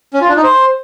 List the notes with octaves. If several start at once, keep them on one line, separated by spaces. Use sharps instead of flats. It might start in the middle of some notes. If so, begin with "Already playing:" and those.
C#4
F4
D4
D#4
C5